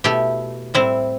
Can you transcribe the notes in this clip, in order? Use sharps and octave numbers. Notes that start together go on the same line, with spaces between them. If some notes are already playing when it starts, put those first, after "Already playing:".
B2 A3 E4 G4
A2 G3 C4 E4